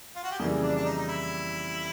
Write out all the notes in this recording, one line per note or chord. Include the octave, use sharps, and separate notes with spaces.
F4
F#4
G4
F2 C#3 E3 G3 A#3 G#4
D4
D4
D#4
D#4
E4